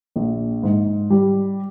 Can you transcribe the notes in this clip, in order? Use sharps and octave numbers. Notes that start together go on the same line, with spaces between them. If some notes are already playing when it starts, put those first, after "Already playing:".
A#1
G#2
G3